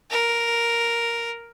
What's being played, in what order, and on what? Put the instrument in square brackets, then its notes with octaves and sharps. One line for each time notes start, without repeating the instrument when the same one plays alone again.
[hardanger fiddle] A#4